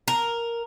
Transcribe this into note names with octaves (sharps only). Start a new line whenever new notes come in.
A#4